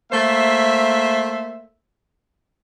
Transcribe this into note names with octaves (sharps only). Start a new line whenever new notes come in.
A3 A#3 C5 E5